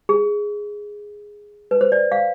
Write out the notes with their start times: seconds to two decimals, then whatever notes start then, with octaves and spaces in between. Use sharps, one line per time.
0.09 G#4
1.71 B4
1.81 C5
1.92 D5
2.12 F5